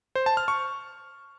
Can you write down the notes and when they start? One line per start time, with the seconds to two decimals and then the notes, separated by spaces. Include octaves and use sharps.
0.15 C5
0.26 A5
0.37 F6
0.48 C#6